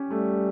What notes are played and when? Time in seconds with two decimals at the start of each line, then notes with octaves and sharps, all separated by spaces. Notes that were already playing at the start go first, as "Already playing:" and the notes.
Already playing: C#4 G4
0.11 G3 A3